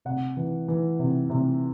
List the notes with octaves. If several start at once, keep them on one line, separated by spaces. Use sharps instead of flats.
C3 F#5
E3
E3
C3
C3